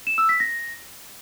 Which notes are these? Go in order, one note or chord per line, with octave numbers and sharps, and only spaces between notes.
E7
E6
B6
A#6